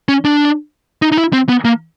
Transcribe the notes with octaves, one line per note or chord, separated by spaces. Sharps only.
C#4
D4
D#4
D#4
E4
C4
B3
A#3